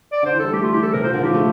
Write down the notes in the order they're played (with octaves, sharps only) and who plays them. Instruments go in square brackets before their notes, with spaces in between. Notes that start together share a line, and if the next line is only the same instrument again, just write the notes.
[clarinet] D5
[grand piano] D3
[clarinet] C5
[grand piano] E3
[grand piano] G3 [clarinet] A4
[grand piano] A3 [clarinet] G4
[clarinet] F4
[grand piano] E3 [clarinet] G4
[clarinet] A4
[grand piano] C3 [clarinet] A#4
[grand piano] A#2 [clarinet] C5
[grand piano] D3 [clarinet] A#4
[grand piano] F3 [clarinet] G4
[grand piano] A3